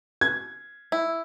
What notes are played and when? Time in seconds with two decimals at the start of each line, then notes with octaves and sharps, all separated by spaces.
0.21 G#6
0.92 E4